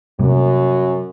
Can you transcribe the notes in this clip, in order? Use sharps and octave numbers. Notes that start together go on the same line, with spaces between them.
F#2 C3 G3 A#3